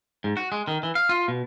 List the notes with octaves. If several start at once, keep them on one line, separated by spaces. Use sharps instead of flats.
G#2
F#4
G#3
D#3
E3
F5
F4
B2